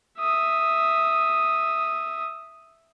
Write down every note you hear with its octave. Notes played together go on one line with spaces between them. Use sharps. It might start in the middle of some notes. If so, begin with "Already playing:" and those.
E5 D#6